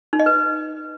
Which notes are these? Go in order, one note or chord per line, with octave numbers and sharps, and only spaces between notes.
D#4
D#5
B4